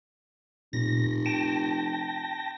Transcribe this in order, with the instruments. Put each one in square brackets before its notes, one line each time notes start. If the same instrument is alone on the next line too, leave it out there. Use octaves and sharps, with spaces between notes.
[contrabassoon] F1 [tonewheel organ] A#2 A#6
[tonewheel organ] G5 A5 A#6